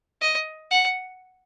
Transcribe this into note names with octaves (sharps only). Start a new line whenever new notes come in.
D#5
F#5